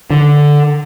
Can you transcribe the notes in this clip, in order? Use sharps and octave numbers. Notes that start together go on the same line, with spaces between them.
D3